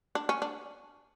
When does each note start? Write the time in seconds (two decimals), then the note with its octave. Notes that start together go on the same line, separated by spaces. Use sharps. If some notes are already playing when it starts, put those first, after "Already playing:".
0.15 D4
0.29 C#4
0.42 D4